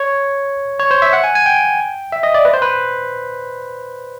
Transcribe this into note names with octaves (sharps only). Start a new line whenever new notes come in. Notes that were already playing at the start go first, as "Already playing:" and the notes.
Already playing: C#5
C#5
C5
E5
F#5
G#5
G#5
G5
E5
D#5
D5
B4
C5
B4